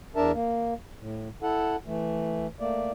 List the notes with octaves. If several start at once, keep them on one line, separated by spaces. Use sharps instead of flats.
E2 D4 A#4 E5 A5
A#3
A2
E4 A4 F#5
E3 A3
A3 A#3 D5